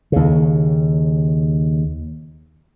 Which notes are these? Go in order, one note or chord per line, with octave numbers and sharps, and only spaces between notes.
D#2 C#3